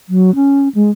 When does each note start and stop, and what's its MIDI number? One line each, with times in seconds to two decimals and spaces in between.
0.09 0.34 54
0.35 0.68 61
0.75 0.91 56